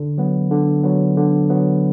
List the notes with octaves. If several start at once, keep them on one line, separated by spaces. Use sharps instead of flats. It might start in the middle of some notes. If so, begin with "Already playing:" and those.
Already playing: D3
F#3 B3
D3
F#3 B3
D3
F#3 B3